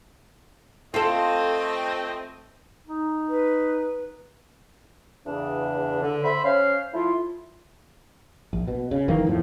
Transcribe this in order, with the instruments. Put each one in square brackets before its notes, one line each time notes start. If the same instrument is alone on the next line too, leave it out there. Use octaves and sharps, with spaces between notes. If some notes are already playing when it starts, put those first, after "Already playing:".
[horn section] A3 C4 D#5 [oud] F4 A4
[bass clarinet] D#4
[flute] B4
[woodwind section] E2 C#3 D4
D3
C5 E5 B5
C#4 C5 F5
F3 A3 E4 F4
[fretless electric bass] A#1
B2
C#3
F#1 D#3 E3 A#3
E2 A2 F3